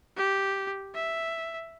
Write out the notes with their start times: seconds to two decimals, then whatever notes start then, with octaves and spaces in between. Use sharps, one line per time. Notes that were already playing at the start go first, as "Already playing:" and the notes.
0.17 G4
0.95 E5